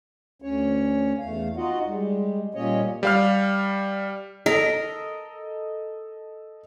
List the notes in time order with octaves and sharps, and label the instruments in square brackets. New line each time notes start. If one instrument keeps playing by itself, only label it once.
[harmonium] D2 C#4 C#5
E2 A3 F5
D#4 F4 F#4 D#5 F#5
G3 G#3
A#2 G3 A#3 C#4 C#5 D#5
[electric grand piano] G3 F5 F6
[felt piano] A4 D#5 [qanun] A#4